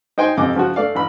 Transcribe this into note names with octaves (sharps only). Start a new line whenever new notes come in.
D#4 C5 G5 G#5 C6
F2 C3 D#5 D6
C#3 F3 F4 F#4
A3 D5 F5
A1 B5